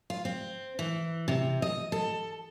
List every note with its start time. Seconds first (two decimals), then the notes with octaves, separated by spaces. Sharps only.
0.10 F4
0.25 C4
0.79 E3
1.28 C3
1.62 D#5
1.92 A4